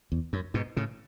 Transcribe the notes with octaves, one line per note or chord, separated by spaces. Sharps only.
E2
F#2
G#2 B2
A2 C#3